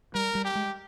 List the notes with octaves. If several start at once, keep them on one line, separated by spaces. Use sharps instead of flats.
G3 A#4
G3
G4
G#3